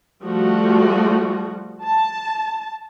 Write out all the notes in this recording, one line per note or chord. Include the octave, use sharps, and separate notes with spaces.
F3 G3 A3 F#4
A5